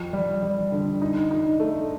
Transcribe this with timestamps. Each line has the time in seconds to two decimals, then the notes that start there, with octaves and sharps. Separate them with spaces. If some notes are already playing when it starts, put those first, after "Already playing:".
Already playing: F2
0.13 G3
0.43 G3
0.72 D3
1.02 D#4
1.31 D#4
1.60 A3